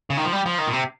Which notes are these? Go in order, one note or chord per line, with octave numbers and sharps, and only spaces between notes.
C#3
D#3
F3
G3
F3
D#3
A#2
C3